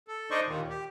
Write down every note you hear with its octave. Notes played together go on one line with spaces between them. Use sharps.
A4
D4 D#4 C5 D5 D#5 C#6
D#2 A#2 D#3
G4